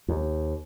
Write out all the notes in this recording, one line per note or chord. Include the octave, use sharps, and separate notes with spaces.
D#2